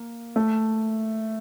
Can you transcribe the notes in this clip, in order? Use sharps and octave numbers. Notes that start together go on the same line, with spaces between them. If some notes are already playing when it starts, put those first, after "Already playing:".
Already playing: A#3
A3